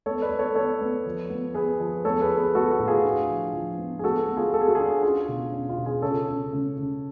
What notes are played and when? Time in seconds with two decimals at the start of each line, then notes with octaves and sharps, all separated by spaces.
0.06 B3 A4 C#5
0.22 B4 D5
0.31 B3
0.39 A4 C#5
0.55 B3 A4 C#5
0.81 B3
1.06 F3
1.30 B3
1.54 B3 G#4 B4
1.80 F3
2.05 B3 A4 C#5
2.21 G#4 B4
2.29 B3
2.37 G#4 B4
2.55 B3 F#4 A4
2.71 F#4
2.79 A2
2.87 F4 G#4
3.04 D4
3.30 F3
3.54 F3
3.78 B3
3.99 G#4
4.04 B3 F#4 A4
4.28 B3
4.37 F4 G#4
4.53 B3 A4
4.61 G#4
4.68 F#4
4.75 D4 F4 G#4
5.02 C#4 F4 G#4
5.28 B2
5.52 C#4
5.69 F4
5.78 B2
5.85 F4 G#4
6.02 C#3 A4 C#5
6.28 C#3
6.53 C#3
6.78 C#3